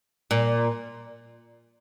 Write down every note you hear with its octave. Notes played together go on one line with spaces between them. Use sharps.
A#2